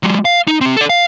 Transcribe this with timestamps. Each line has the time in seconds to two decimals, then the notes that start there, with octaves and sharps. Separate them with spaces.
0.03 F#3 G#3
0.25 F5
0.47 D#4
0.61 C4 G4
0.77 A4 D5
0.90 F5